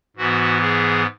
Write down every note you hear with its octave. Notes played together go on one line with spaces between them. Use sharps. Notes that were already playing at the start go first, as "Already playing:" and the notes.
G#2 E3 B3 F#4
G#4